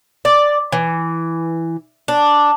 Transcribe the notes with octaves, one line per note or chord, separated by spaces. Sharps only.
D5
E3
D4